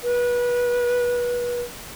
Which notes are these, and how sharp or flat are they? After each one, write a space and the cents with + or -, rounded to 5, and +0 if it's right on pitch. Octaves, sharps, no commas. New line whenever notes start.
B4 -25